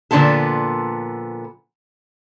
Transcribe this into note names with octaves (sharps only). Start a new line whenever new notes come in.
A#2 D3 F3 B3 A4